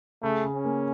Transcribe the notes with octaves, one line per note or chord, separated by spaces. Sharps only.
C#3 A3
C#3
C#4
A#3